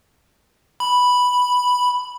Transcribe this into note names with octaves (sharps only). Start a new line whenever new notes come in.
B5